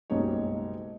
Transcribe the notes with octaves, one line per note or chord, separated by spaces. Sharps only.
F#1 B1 G3 G#3 D#4 C#5